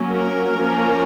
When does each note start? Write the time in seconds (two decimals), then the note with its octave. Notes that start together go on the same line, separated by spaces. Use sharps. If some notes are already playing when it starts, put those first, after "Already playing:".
Already playing: F#3 A#3 C#4
0.14 A#4
0.58 F3 A#3 C#4